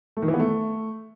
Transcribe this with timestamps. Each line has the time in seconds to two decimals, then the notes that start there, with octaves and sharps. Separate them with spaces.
0.17 A3
0.22 D#3
0.28 E3
0.34 B3
0.40 A3